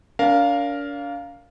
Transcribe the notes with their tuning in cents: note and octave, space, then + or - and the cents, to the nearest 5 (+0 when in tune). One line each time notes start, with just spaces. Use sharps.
D4 -40 A#4 +0 F5 +0